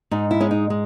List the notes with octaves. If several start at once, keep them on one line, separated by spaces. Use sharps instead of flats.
G#2 D#4
E4
G#3 C#4
D#4
G#3